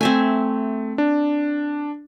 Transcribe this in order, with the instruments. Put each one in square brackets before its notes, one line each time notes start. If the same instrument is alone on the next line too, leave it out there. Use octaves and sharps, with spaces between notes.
[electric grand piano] A3 [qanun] C4 E5 G#5
[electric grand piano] D4